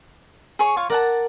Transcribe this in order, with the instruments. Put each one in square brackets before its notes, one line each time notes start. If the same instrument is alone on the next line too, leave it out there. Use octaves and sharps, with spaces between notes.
[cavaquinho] G#4 C#5 C#6
F4 C#5 F5
[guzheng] A#4 [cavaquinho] D5 F#5 A5